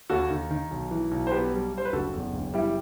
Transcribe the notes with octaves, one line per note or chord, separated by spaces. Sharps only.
D#2 F#4 A4
D#3
D#3
B1
E3
B1
C5
B3 G4 B4
G3
G3 C5
B4
F#1 F#4 A4
E2
F#1
G3 E4 G4